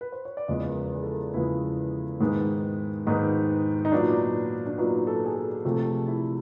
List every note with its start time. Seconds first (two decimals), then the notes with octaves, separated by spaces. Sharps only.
0.01 B4
0.12 C5
0.25 C#5
0.37 D5
0.48 E2 C#3 F3 G#3 B3 D#5
0.69 A#4
0.94 G#4
1.03 A4
1.13 A#4
1.34 E2 C#3 F3 G#3 B3 E4
2.20 G#2 D#3 G#3 B3
3.07 G#2 D#3 G#3 B3 D#4
3.85 D#4
3.92 A#2 F#3 B3 D4
4.67 D4
4.78 A#2 F#3 B3 D#4
5.07 A4
5.26 G#4
5.36 A4
5.64 C3 F3 A3 A4
5.77 A4
5.85 G#4
6.08 E4